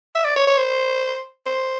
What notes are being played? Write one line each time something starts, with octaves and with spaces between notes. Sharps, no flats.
E5
D5
C#5
C#5
C5
C5